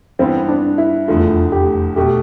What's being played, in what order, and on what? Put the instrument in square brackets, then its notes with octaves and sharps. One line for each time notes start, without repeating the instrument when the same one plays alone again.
[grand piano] G2 E3 B3 [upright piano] C4
[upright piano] D4
E4
[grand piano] F1 E2 D3 A3 [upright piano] F4
[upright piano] G4
[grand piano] B2 A3 [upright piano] G4